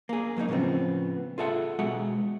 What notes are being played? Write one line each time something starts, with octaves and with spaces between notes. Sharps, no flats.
A#3 G#4
F#2 A#3 B3 D#4
A2 C#3 F3 B3 C4
F4 G#4 A4 E5 F#5
B2 G#3 F#4 E5 F#5